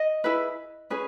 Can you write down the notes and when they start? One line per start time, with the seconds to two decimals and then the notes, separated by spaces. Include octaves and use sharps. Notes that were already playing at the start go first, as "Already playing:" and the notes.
Already playing: D#5
0.24 E4 G#4 B4
0.90 C#4 G#4 B4